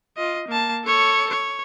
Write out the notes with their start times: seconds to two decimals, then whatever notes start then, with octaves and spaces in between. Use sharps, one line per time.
0.17 F4 D#5
0.48 A#3 A5
0.84 A4 C#5
1.30 C#5